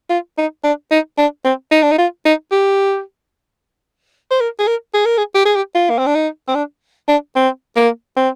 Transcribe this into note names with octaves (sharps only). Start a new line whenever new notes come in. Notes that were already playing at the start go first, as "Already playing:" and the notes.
F4
D#4
D4
D#4
D4
C4
D#4
D4
D#4
F4
D#4
G4
C5
A#4
G#4
A#4
G#4
A#4
G#4
G4
G#4
G4
F4
A#3
C4
D4
D#4
C4
D4
D4
C4
A#3
C4